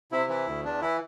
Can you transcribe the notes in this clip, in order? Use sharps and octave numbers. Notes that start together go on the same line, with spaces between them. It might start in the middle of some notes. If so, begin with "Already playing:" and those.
C3 E4
E3 E4
D2
E2 D4
E3 E4